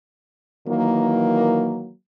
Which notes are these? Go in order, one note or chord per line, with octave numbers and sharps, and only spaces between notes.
D#3 E3 F#3 A#3